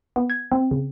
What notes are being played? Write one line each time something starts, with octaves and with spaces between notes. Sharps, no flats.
B3
G#6
C4
C#3